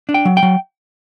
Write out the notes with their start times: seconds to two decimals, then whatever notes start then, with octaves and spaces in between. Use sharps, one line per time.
0.09 D4
0.14 G5
0.25 F#3
0.37 G5
0.43 F#3